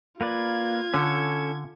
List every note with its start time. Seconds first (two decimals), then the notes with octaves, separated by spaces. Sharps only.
0.21 A#3 F4 B4 D5 G#6
0.94 D3 C#4 A4 C#5